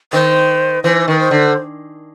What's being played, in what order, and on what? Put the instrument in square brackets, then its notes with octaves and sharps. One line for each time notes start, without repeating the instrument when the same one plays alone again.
[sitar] D#3 [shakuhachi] C5
[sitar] E3 [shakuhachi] C5
[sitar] D#3 [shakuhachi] B4
[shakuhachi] C5
[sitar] D3